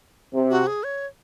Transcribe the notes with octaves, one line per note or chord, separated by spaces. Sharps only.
C3
F#4
G#4
C#5